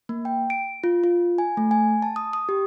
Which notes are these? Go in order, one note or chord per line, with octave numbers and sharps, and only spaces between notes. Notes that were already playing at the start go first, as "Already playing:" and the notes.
A#3
G5
D7
F4
F4
G#5
A3
G#5
A5
D#6
D#6
G4